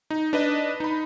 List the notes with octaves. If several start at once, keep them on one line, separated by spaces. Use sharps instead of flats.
D#4
D4 B4 D#5
D#4 B5